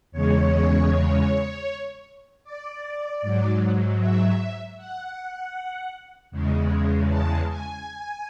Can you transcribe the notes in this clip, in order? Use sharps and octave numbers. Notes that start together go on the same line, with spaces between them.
E2 C#3 G#3 C#5
D5
G#2 F#3
E5
F#5
E2 C#3 G#3
A5
G#5